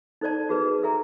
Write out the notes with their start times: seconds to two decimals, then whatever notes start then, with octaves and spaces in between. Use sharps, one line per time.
0.21 D#4 A4 C5 D5 A5
0.49 F#4 G#4 B4
0.83 A4 E5 G#5 A#5